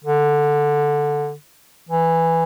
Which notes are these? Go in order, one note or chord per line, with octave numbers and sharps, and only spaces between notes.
D3
E3